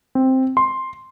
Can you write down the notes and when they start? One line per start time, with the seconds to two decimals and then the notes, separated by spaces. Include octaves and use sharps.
0.15 C4
0.57 C6